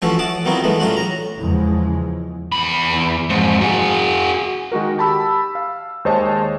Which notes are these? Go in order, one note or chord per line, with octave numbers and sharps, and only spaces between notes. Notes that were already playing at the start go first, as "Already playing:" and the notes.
E3 F3 A3 C#4 F#4 A4
F#5 A5 D6 D#6
D#3 F#3 B3 C4 E4 F4
E3 G#3 A3 B3
A2 F#3 C#4 D4 F4 F#5
A#5
E2 C#3 F3 G#3
E2 B5
F2 G#2
F#4 G#4
D#3 G#3 F#4 A#4
G4 A5 B5 E6
F5
D#2 G#3 C5 C#5 D#5 A5